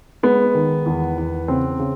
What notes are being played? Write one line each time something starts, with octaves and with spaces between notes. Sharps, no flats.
G#3 B3
D#3
E2
E2
C#3 C4
C#3